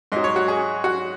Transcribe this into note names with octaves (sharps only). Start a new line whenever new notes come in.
G#2 F#3 D#5
C#5
F#4
G#4
F#4